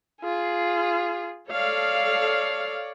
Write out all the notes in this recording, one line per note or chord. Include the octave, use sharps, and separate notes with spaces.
F4 G#4
A4 C#5 D5 F5